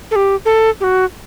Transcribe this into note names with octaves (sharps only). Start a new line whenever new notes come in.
A4
G4
A4
G4
F#4